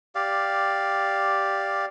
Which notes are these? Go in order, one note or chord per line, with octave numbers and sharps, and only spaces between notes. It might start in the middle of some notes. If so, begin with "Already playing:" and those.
G4 D5 F5